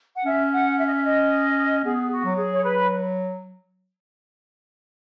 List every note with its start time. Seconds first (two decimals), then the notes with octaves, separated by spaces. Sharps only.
0.15 F#5
0.25 C#4 E5
0.52 F#5
0.78 E5
0.86 D#5
0.93 E5
1.04 D#5
1.84 B3 G#4
2.11 F#4
2.24 F#3
2.37 G#4
2.53 C#5
2.63 B4